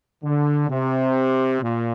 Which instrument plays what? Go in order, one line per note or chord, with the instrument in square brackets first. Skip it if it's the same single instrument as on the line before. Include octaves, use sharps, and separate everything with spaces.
[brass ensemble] D3
C3
A#2